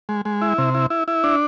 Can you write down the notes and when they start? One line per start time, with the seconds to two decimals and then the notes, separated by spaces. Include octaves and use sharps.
0.09 G#3
0.25 G#3
0.42 E4
0.58 C3
0.75 E4
0.90 E4
1.08 E4
1.24 D4